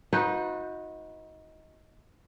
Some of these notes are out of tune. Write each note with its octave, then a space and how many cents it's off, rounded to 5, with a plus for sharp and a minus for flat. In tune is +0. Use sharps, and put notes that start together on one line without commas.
D#4 +20 F#4 -30 B4 +0